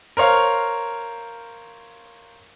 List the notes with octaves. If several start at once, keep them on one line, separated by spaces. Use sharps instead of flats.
A#4 C5 C#5 F5